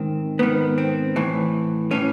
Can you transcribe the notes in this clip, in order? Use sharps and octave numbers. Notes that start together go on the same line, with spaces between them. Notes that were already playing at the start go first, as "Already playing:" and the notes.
Already playing: G#2 D#3 C4
G#2 D#3 B3
C4
A2 E3
A2 E3 C#4